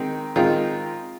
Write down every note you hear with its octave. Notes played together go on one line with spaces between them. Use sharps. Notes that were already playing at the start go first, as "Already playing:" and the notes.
Already playing: D#3 G#3 C4
D#3 G#3 C4 F4